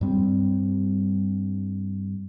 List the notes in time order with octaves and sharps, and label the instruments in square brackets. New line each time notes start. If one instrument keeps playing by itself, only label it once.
[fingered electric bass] G2 G3 C4